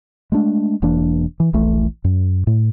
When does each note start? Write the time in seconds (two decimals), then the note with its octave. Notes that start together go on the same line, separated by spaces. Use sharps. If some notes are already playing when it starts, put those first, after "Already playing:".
0.32 G#3 A3 D4
0.82 E1 E3 A#3 D4
1.40 E3
1.53 D#1 A#1 E3 A3
2.04 F#2
2.47 A2